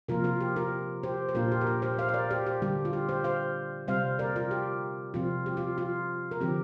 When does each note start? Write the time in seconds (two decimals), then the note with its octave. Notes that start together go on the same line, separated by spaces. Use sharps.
0.08 C3 F3 A#3 F4 A#4
0.24 F4 A#4
0.40 G4
0.56 F4 A#4
1.03 G4 C5
1.29 C5
1.35 A#2 A#3 D4 F4 A#4
1.52 G4
1.61 A#4
1.67 G4
1.82 G4 C5
1.98 C5 F5
2.09 F5
2.14 A#4 D5
2.31 G4 C5
2.46 G4
2.62 D3 G3 D4 G4
2.85 F4
2.93 G4
3.09 G4 C5
3.24 C5 F5
3.88 C3 G3 C4 C5 F5
4.19 A#4 D5
4.36 F4 A#4
4.51 G4
5.14 C3 F3 C4 F4
5.46 G4
5.57 F4
5.78 F4
6.31 A#4
6.40 D3 F3 C4 G4